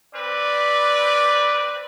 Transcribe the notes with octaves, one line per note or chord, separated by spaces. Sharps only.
C4 B4 D5